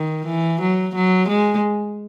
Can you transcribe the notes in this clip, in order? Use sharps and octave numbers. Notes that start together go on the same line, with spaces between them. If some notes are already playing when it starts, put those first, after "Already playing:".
Already playing: D#3
E3
F#3
F#3
G#3